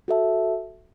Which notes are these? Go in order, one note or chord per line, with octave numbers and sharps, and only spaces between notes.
F#4 A4 E5 A5